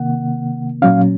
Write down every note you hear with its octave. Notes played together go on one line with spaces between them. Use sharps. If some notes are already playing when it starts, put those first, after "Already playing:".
Already playing: C3 D#3 A#3 F#5
A#2 F#3 C#4 F5